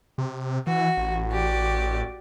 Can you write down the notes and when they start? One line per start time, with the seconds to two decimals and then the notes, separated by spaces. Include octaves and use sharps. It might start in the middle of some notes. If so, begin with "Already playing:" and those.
0.18 C3
0.67 E3 F#4
0.97 A1
1.29 F#4 G4 D5